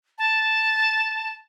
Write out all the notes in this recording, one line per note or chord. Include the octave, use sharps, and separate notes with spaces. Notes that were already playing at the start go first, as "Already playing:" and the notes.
A5